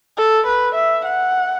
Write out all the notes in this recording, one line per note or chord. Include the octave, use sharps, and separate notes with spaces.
A4
B4
E5
F#5